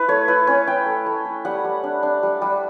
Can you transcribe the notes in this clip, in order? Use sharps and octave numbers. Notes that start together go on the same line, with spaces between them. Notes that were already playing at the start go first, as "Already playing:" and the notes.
Already playing: E4 B4
A3 C#5
E4 B4
C#4 C#5
E4 G5
A3
A3
E4
G3 F#5
G3
D4
D4
G3
G3